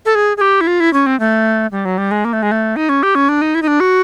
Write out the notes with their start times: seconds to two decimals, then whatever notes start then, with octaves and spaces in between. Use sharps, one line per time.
0.05 A4
0.15 G#4
0.37 G#4
0.41 G4
0.61 E4
0.67 F4
0.80 E4
0.93 C#4
1.06 C4
1.20 A3
1.72 G3
1.85 F#3
1.98 G3
2.11 G#3
2.25 A#3
2.33 A3
2.43 G#3
2.52 A3
2.76 D#4
2.89 C#4
3.03 G4
3.15 C#4
3.29 D4
3.42 D#4
3.55 E4
3.62 D#4
3.68 D4
3.80 F#4